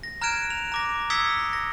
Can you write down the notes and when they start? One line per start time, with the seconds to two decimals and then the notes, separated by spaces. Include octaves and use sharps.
0.03 A#6
0.21 A#5 F6 F#6 G#6 D7 E7
0.50 F7
0.72 A#5 D6 A#6
1.10 D#6 E6 G#6 B6 C#7 G7
1.53 A#6